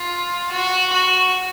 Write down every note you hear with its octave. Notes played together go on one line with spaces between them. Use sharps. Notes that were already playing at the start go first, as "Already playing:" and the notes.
Already playing: F4
F#4
F#4